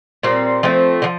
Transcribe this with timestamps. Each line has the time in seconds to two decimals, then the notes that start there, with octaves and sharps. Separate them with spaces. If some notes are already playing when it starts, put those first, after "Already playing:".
0.23 A#2 G3 C4
0.63 F3 A3 C4
1.02 D3 F3